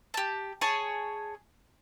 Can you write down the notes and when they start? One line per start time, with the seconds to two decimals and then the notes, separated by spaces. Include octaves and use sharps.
0.14 G4 A5
0.61 G#4 C#5 G#5 A5